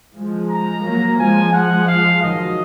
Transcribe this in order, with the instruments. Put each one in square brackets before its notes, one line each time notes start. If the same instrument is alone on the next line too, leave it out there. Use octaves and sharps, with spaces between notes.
[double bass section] F3 G#3
[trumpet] A#5
[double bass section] F#3 A#3
[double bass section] F3 G#3 [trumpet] G#5
[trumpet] F#5
F5
[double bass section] D#3 F#3 [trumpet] D#5